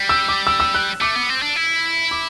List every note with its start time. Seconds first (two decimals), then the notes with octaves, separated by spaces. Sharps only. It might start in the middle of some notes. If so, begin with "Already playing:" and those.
Already playing: G3
0.09 E6
0.28 D6
0.47 E6
0.60 E6
0.74 F#6
1.01 A3 D6
1.15 B3
1.29 C4
1.42 D4
1.56 E4
2.11 D6